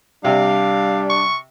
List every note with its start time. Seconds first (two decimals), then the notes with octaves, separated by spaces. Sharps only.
0.25 C3 G3 D4 F5
1.10 C#6